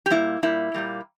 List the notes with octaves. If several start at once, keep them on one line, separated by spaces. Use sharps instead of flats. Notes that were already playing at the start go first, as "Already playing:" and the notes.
G4
A#2 G3 A#3 E4
A#2 G3 A#3 E4
A#2 G3 A#3